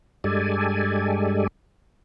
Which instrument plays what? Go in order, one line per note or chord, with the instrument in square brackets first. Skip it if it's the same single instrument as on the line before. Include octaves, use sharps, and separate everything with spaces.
[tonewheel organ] G2 G#3 G4 A4 D5 G#5